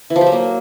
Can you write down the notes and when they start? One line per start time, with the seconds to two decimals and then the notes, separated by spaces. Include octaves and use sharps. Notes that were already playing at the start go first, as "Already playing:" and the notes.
0.10 E3
0.16 F3
0.21 G4
0.26 F#3
0.32 A#3